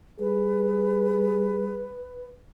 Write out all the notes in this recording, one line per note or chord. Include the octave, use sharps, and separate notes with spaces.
G3 G#4 B4